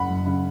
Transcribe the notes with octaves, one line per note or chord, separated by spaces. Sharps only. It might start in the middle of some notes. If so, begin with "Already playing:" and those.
Already playing: F#1 F#5 B5
F#2
C#3